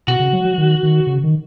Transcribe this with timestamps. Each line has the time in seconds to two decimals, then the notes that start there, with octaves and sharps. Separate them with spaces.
0.07 B2 F#4
0.20 C#3
0.33 F#3
0.45 F#3
0.58 D#3
0.83 D#3
1.07 C#3
1.23 D#3